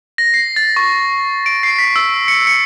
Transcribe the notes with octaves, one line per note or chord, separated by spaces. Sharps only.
A#6
C7
A6
C#6
D7
C7
B6
E6
C#7
C#7